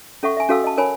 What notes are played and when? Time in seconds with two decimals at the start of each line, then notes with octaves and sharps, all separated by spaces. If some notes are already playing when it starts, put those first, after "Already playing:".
0.23 C#4 A4 E5 F#5 C#6
0.37 E5 G#5
0.49 C#4 F#4 A4 F5 D#6 E6
0.64 D#5 A5
0.78 A#4 C#5 G#5 B5